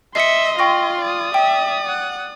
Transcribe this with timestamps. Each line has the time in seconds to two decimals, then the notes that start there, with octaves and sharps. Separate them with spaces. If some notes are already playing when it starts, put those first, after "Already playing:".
0.15 D#5 E5 C6 C7 C#7
0.59 F4 G5 C#6 A#6
1.01 D5 D#6
1.34 E5 G5
1.86 F#5